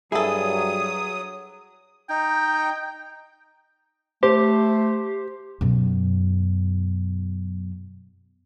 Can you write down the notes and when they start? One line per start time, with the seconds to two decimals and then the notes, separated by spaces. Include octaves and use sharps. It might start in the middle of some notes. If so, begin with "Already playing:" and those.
0.12 G2 F#3 E4 G#4 A4 D#6
2.10 D#4 G5
4.23 A3 G4 C5
5.61 F#2 B2